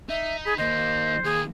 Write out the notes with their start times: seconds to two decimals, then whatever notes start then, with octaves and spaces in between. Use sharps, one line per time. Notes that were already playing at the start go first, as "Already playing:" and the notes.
0.09 D#4 E5
0.45 G#4 B5
0.58 D#3 A#3 C5 D#5
1.24 D#2 G#4